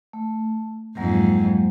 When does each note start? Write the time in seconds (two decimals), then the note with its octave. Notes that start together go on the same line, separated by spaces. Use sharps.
0.13 A3
0.97 F2 G#2 F#3 G#3 A#3